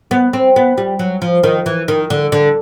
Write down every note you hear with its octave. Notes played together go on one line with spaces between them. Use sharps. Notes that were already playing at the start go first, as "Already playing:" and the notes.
B3
C4
B3
G3
F#3
F3
D#3
E3
D#3
D3
D3